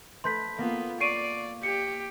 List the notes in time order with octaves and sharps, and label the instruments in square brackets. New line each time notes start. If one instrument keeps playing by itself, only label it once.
[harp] A3 B4 B5 [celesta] C6 G6 B6
[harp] A#3 F4 [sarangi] B3
[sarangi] D5 [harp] C#6 [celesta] C7 D7 D#7
[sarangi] G4 [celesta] C#7